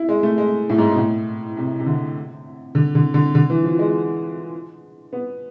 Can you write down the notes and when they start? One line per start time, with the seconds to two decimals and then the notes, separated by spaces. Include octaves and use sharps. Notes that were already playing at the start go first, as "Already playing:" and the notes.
Already playing: E4
0.09 G#3
0.23 A3
0.38 G#3
0.69 A2
0.78 G#2
0.92 B2
0.98 A2
1.57 C3
1.79 C3
1.86 D3
2.75 D3
2.95 D3
3.14 D3
3.35 D3
3.50 E3
3.64 F3
3.79 G#3
5.13 B3